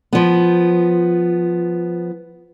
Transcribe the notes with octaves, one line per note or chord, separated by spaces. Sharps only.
F3 B3